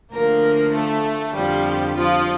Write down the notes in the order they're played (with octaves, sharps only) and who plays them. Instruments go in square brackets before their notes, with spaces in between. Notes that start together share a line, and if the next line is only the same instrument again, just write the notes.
[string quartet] D2 D3 F3 A#3 A#4
A3 A4
F2 D3 F3 G3 G4
F3 F4